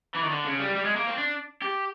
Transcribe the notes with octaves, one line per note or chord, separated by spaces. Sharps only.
E3
D#3
D3
C#3
G3
G3
G#3
A#3
C4
D4
G4